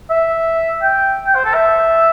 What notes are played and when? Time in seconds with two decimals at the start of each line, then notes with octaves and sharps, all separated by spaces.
0.10 E5
0.82 G5
1.26 G5
1.35 C5
1.45 A4
1.54 E5